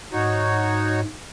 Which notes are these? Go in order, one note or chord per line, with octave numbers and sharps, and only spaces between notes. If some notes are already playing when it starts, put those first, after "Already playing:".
G#2 D#4 F#4 C#5